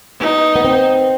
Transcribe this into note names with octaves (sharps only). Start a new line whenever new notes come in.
B3 D#4
B3
C4